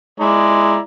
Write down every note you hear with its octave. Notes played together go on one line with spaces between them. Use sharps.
G#3 E4 D5 A#5